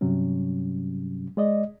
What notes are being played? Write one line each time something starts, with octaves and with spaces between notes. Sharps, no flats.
G2 C3 F#3 G3 C#4
G#3 D5 D#5